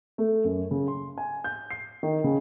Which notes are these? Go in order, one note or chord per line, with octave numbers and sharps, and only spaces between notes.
A3
F#2
C#3
C6
G#5
G6
C7
D#3
C#3